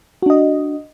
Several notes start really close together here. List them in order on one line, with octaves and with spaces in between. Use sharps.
F#4 D4 D#5